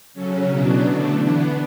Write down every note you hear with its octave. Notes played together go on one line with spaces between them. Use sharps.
C#3 F#3 C#4 A4
B2 F#3 B3 D4 E4
D3 A3 D4 F#4
E3 B3 D4 E4